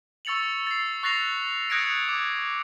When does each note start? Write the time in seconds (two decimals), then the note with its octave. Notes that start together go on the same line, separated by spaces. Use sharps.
0.25 C#6 E6 A6 C#7 F7 F#7
0.67 A6 C7
1.03 C#6 F#6 A6 A#6 C7 F7
1.70 D#6 F#6 G#6 A#6 C#7 D7
2.08 D6